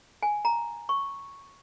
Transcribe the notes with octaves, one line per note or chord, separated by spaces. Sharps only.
G#5
A#5
C#6